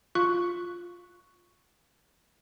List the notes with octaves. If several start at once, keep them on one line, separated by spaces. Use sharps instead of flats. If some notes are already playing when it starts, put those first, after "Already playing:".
F4 C#6 F#6